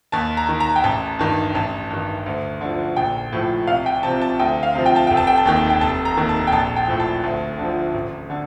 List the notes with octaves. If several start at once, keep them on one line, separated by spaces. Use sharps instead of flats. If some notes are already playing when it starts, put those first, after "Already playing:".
D#2 A5
A#5
D#3
A#5
G5
A1 A5
G2 D#3
A1 A5
G2 D#3
D2
D3 F3
A#1 G5
A2 F3
C2 F5
G5
C3 F3 A5
A5
D2 G5
F5
C3 F3
G5
A5
F1 G5
A5
G5
A5
D#2 D#3 G5
G5
F1 A5
A#5
D#2 D#3
A5
G5
A#1 A5
G5
A2 F3
A5
D2
D3
F3
A1
D3